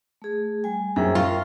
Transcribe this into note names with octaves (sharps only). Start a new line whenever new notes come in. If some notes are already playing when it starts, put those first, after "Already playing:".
A3 G#4
G3 G#5
F#2 G#4 C5 G5
F4 A#4 G5 C#6